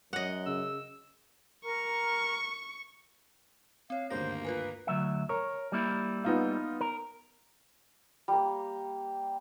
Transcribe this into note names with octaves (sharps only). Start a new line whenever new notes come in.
F#2 C#5 D#5 F#5
C#3 E6
A#4 C#6
C4 C#5 F5
G#1 D2 G2 A#3 C5 D6 A#6
F4 A#4 B4 G#5
D2 F#3 E5
A#4 C#5
G3 A#3 E4
B3 D#4 F4
A#4
G3 A#3